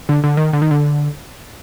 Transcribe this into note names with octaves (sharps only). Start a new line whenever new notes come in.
D3
D3
D#3
D3
D#3
D3